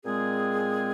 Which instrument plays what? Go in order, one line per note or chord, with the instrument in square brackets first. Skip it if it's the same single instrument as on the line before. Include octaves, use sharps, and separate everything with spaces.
[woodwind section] A#2 G#3 C4 G#4